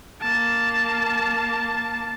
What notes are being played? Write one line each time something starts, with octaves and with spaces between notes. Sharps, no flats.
A#3 A5